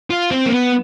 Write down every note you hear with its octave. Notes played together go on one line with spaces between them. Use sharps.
F4
C4
A#3
B3